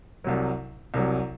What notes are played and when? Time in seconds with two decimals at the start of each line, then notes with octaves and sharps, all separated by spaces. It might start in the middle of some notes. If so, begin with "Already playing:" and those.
0.24 C2 C3 F#3
0.94 C2 C3 F#3